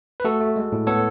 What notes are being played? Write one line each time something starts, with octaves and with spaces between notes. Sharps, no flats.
B4
A3 F#4 A4
A3
G#3
A2
B3 A4 C#5